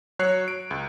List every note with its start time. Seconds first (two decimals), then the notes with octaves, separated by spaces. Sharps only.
0.19 F#3 C#5 F#6 C7
0.48 D7
0.71 C#2